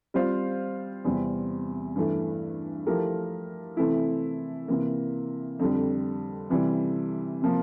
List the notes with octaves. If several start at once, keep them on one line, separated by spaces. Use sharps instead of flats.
G3 C4 F4 C5 F5
E2 C3 G3 C4
G2 E3 A3
F3 A3 E4 G4 A#4
C3 E3 A3 C4 E4
C3 E3 A#3
F2 D3 G3
C3 E3 G3
C3 F3 A#3